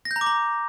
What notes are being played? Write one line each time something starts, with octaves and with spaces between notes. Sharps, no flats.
A#6
G6
A#5
D6
A#5